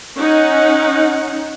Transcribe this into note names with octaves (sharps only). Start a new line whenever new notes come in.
C#4 D#4 F#5